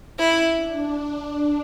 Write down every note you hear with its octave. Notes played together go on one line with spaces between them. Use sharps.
C#4 E4
D4